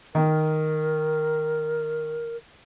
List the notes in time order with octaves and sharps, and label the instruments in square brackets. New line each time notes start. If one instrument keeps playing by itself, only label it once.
[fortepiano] D#3 [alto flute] A#4